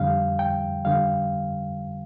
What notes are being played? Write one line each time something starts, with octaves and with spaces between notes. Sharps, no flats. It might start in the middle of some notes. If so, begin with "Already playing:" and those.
Already playing: F2 D3 G3 F5
G5
D3 G3 F5